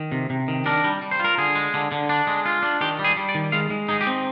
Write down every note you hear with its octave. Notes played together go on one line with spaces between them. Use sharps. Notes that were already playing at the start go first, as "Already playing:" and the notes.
Already playing: D#3
C3
C3
D#3
D4 A#4
G3
G3
C5
F4 A#4
D3 G#4
G#3
D3
D3
D4
G#3
F4
D4
D#3 G4
G3
G#4
G3
D5
D#3
G#3 F5
G#3
D#4 G#4
G4
C4